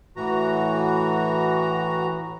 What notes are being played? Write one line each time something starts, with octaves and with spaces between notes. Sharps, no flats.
A2 E3 F#4 A#5